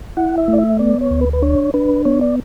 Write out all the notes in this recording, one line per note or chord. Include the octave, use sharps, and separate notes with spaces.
E4 F#5
E5
A3
D5
E5
B3 D5
C#5
D2
B4
B4
D4 C#5
D4 B4
B3 C#5
D5